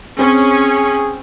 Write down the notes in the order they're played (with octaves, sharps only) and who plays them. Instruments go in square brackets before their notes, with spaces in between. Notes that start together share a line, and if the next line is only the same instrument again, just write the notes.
[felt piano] C4 [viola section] C#4 [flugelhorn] G#4